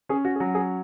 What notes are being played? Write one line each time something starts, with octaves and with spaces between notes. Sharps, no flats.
C#4 G#4
F#4
G#4
F#3 F#4
G#4